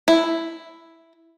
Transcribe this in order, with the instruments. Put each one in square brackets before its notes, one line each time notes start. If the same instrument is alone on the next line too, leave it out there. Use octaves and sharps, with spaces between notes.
[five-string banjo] E4